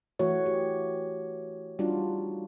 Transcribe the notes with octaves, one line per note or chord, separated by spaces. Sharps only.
E3 A3 F#4 C#5
G4
G3 D4 D#4 F4 F#4